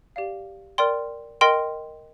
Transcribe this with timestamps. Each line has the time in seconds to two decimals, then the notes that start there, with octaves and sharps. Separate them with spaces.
0.16 G4 D5 F5
0.78 A#4 D5 G5 C6
1.41 A#4 D#5 G5 C6